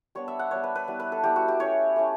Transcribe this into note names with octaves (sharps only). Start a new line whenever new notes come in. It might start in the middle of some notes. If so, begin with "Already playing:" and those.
G3 B3 D4 C#5
E5
F#5
G3 B3 D4 C#5
B4
B4
G3 B3 E4
B4
A4
G3 B3 E4 G4
F#4
G4
A3 C#4 E4 C#5
A3 C#4 E4